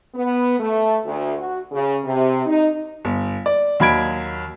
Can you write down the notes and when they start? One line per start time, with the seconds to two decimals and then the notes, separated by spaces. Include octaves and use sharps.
0.15 B3
0.59 A3
1.05 D2
1.38 F#4
1.72 C#3
2.05 C3
2.46 D#4
3.05 G1
3.46 D5
3.80 D#2 F#3 B5 G#6 D7